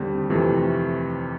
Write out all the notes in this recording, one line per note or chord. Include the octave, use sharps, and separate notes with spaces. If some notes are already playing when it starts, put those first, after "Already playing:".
Already playing: D#2 D3 G3 C4
F2 C3 E3 A3